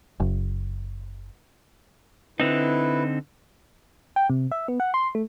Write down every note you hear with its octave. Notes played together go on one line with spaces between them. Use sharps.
F#1
D3 C4 D#4 E4 B4
G5
C3
E5
B3
F#5
C6
A3